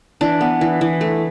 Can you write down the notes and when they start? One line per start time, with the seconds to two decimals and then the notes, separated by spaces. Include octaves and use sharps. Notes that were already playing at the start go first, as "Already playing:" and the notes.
0.21 E3 D4
0.41 B3
0.61 E3
0.81 E3
1.01 A3